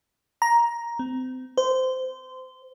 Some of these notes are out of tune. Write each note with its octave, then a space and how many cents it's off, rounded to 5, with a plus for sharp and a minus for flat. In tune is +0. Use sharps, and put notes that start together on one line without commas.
A#5 +10
C4 -30
C5 -20